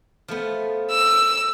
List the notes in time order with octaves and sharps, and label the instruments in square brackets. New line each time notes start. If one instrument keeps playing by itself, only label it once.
[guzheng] F3 A3 B3
[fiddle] E6